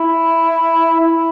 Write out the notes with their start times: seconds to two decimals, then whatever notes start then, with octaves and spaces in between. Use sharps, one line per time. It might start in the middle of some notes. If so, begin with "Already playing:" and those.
Already playing: E4
1.01 E4